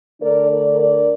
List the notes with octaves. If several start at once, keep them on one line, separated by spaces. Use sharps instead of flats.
D3 A3 D4 A#4 D5
A#4 D5
A#4 D5